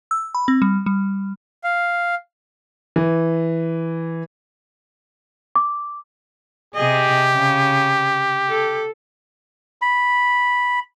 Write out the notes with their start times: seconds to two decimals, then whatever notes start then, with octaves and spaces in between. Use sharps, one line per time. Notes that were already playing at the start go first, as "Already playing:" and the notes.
0.11 E6
0.35 B5
0.48 C4
0.62 G3
0.86 G3
1.64 F5
2.96 E3
5.56 D6
6.75 C3 G4 G#4 D#5
7.33 C#3
8.49 A4
9.82 B5